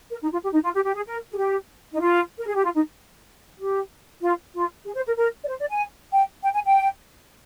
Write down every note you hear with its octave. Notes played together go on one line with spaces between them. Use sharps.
A#4
D#4
F4
G4
D#4
F4
G4
G4
G#4
A#4
G#4
G4
D#4
F4
A#4
G#4
G4
F4
D#4
G4
F4
F4
G#4
C5
A#4
A#4
D5
C5
D5
G#5
G5
G5
G#5
G5